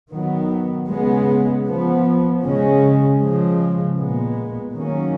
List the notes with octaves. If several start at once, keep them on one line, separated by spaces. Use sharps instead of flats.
D#3 F#3 B3
C#3 G#3 B3
F3 B3
C#3 G#3 C#4
C#3 F3 G#3
A#2 G#3 B3
D#3 F#3 A#3 C#4